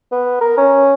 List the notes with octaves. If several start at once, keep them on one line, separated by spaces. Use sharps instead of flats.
B3
A#4
C#4